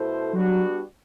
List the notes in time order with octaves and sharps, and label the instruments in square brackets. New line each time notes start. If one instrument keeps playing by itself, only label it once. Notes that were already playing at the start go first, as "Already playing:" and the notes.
Already playing: [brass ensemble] B2 A3 E4 A4 C5
[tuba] F#3 [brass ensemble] G3 B3 D4 F#4